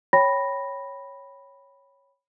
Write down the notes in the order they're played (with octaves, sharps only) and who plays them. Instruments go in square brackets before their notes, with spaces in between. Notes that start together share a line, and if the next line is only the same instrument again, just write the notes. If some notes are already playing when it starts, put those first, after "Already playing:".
[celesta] C#5 G5 B5 A#6